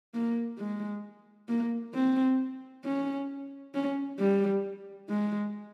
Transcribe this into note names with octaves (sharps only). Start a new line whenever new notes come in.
A#3
G#3
A#3
C4
C#4
C#4
G3
G#3